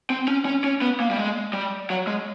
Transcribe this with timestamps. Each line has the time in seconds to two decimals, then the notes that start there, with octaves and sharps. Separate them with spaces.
0.10 C4
0.28 C#4
0.45 C#4
0.64 C#4
0.82 B3
1.00 A#3
1.11 G3
1.17 G#3
1.53 G3
1.90 F#3
2.07 G#3